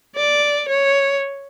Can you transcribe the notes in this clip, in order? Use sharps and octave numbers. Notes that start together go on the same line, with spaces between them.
D5
C#5